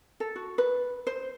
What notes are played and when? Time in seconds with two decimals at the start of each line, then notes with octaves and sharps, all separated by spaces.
0.20 A4
0.36 F#4
0.58 B4
1.07 C5